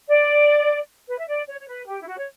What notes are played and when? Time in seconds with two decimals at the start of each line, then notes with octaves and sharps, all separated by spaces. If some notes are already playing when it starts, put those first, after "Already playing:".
0.09 D5
1.08 B4
1.19 E5
1.27 D5
1.48 C#5
1.60 C#5
1.68 B4
1.87 G4
2.02 E4
2.07 F#4
2.17 C#5